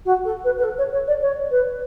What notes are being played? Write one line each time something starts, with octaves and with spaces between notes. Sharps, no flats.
F#4
A4
B4
B4
A4
C#5
C#5
D5
C#5
B4